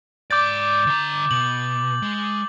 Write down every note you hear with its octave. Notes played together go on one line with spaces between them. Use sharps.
G#2 D5 D6 G6 A6
D3 A#5
B2 F#7
G#3